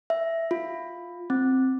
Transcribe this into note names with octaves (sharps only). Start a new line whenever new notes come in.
E5
F4
C4